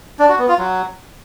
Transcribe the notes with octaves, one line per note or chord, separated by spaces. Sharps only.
D4
F#4
B3
F4
F#3